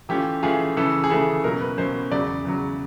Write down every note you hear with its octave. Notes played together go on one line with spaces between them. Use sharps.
E3 A3 C#4 F4 G4
E3 A3 C#4 F4 G#4
C#3 E3 A3 A4
G#4
C#3 E3 A3 A4
B2 F#3 A#3 C#4 A#4
B4
B2 F#3 A#3 C#4 C5
E2 C#3 F#3 D5
E2 C#3 F#3